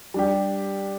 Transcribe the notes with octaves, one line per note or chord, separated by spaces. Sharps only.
G3 D4 G4